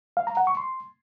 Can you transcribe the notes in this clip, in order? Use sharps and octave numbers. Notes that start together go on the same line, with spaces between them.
F5
A#5
F#5
C#6
C6